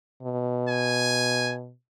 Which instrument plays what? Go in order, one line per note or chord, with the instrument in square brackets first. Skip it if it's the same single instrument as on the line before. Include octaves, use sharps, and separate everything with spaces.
[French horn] B2
[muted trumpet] G#5